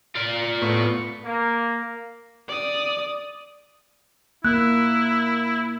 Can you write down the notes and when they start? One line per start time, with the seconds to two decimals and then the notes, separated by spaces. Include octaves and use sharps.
0.15 F4 D5
0.62 A2 B3 C#6
1.24 A#3
2.48 D5 D#6
4.45 A#3 E4 F#6